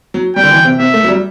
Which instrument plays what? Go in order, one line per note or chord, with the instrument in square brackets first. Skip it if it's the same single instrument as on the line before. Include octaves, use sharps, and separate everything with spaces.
[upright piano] F#3
[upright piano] G3 [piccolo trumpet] G5
[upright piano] D3
E3
C3
[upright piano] C3 [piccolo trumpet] E5
[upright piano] A3
F#3
G3